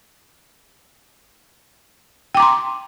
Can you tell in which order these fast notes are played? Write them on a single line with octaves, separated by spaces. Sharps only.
G5 D6 A#5 C6